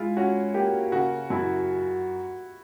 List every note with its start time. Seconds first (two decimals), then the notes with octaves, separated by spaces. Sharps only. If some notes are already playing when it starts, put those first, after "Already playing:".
Already playing: G#3 E4 F4
0.17 C#4 F#4
0.54 A#3 G4
0.92 C#3 F#4
1.30 F#2 E4